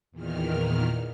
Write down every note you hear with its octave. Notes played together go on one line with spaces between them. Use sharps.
E2 A#2 D#3 F6